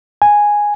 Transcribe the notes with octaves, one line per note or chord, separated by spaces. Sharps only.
G#5